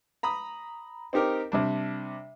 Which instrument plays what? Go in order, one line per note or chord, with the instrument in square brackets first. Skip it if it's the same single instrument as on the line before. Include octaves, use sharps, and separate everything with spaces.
[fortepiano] A#5 B5 D#6
C4 D#4 G4 A#4
C3 G3 D4